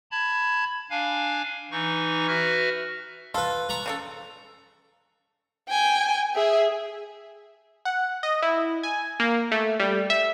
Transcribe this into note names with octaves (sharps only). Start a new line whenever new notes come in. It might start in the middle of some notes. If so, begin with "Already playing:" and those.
A5 B5 G#6
D4 F5 G#5
E3 D#4 C#6
F#4 B4 E5 F6
F4 A4 B4
A#5 B5 C#6
C#3 D4 A4
G5 G#5
G#4 E5
F#5
D#5
E4
G#5
A#3
A3
G3
E5